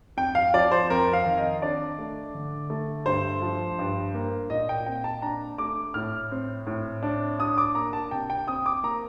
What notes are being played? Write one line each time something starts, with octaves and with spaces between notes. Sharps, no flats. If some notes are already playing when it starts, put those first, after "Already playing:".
F2 G5
F5
F3 D5
C5
F2 A#4
F5
D#3
D#5
D4 D5
A3
D3
A3
G2 C5
F3
G2
A#3
A#2 D#5
G5
C4 G5
A5
D4 A#5
A3 D6
A2 F6
C4
A2
D4
D4 D#6
D6
A#3 A#5
A5
C3 G5
G5
C4 D#6
D6
A#3 A#5